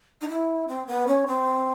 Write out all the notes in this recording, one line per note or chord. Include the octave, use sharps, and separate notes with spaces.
D#4
E4
C4
B3
C#4
C4